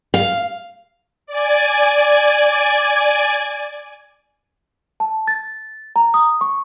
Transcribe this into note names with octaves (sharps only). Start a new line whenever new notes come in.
F5
D5 G#5
A5
A6
A#5
D#6
C#6